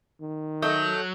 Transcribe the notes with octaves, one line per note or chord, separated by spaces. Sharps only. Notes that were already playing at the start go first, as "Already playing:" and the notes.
D#3
F#3 A3 D#5 G6